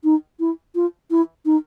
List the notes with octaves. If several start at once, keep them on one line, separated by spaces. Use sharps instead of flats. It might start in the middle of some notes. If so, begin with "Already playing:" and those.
D#4
E4
F4
E4
D#4